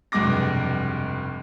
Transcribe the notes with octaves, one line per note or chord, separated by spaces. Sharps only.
F1 B1 G2 G#3 D6 A#6